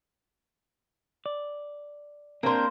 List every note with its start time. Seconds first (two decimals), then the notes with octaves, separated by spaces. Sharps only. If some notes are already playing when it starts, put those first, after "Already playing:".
1.26 D5
2.43 A#3 C4 D4 A#4 C5